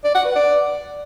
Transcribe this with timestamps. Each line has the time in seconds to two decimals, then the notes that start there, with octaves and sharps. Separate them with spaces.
0.04 D5
0.15 F#5
0.25 B4
0.36 D5